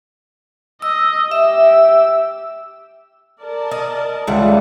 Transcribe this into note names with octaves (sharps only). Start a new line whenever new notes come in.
D#5 E6
G4 E5 E6
A#4 D5 A5
D#5
C#2 E3 G3 A4 F#5